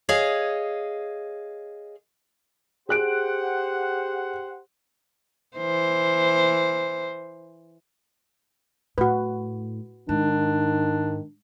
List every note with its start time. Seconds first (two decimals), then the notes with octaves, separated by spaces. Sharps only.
0.09 G#4 C#5 D#5 F5
2.89 G4 G#4 C5 F#5 F#6 D7
5.58 E3 C5
8.98 A2 F#4 B4
10.09 G#2 D#3 D4